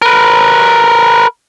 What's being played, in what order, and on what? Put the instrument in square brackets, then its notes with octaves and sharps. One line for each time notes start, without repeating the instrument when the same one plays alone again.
[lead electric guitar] A#4 B4